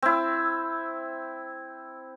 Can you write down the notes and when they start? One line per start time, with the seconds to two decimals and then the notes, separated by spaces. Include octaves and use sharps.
0.02 C4 E4